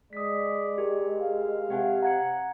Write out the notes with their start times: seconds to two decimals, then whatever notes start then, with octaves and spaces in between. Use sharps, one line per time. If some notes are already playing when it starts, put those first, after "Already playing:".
0.13 G#3 D5 D#6 B6
0.78 G4 G#4 A#4
1.21 F5
1.70 C3 G4 F#5 G#5
2.02 F#5 A#5 G#6 C#7